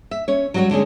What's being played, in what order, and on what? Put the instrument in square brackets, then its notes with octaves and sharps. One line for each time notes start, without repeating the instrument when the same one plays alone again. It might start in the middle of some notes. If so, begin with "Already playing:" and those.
[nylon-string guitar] E5
C#4 C#5
F#3 G3 F#4 G4 C#5
D3 G#3 C#4 G#4